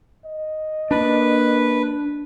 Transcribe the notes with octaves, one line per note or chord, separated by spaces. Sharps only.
D#5
A#3 D4 B4